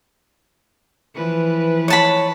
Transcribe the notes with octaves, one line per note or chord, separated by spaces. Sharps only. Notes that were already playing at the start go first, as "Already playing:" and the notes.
E3 F3 B4
C#5 A5 B5